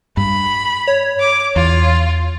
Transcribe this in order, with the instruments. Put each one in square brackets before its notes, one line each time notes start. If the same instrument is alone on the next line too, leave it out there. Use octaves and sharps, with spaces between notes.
[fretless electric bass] G2 [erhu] B5
[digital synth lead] C#5
[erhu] D6
[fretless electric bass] E2 [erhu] F4